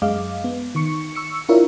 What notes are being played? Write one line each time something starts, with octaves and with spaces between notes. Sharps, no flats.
F#2 G#3 D#5 F5 D6
B3
D#3 C#6 C#7
C#6 E6 C#7
D4 E4 F4 A#4 C#5 E5